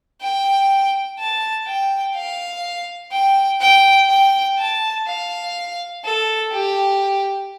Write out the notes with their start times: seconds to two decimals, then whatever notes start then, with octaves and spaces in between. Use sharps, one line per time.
0.21 G5
1.19 A5
1.67 G5
2.16 F5
3.13 G5
3.61 G5
4.10 G5
4.58 A5
5.07 F5
6.05 A4
6.53 G4